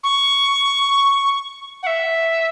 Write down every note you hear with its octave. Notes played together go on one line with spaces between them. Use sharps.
C#6
F#5
E5